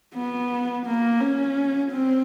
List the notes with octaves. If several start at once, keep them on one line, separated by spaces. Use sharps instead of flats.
B3
A#3
C#4
C4